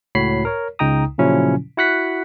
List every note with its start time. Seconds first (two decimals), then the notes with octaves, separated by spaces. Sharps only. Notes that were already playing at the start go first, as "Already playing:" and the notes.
0.15 C#2 A2 F#4 C#5 B5 C7
0.45 A#4 C#5
0.79 C#2 C#3 D#4 G5 A#5 D#6
1.19 A#2 C#3 F3 F#3 C#4 E4
1.77 E4 F#4 F#5 F#6 B6